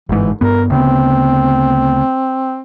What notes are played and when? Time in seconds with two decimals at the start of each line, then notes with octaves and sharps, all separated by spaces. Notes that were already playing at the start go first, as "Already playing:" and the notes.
0.09 G1 G#2 E3
0.41 G2 B3 A#4
0.70 D2 C#3 B3 C4